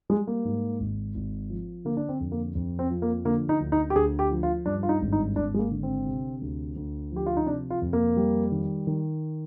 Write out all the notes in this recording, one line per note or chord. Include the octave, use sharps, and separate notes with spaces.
G3 G#3
A#3
G#2
G#1
G#1
F3
D3 A#3
D4
C4
F2
A#3
F2
C4
F3
A#3
D3 A#3
D#4
D2
D#4
G4
D2 G#4
G4
F3
F4
G2 D4
F4
D#4
G#1
D#4
G#1 D4
G#3
A#3
D3
C4
C3
D2
D2
F3 G4
F4
D#4
C3 D4
F4
F2
A#3
G3
D#3
D#3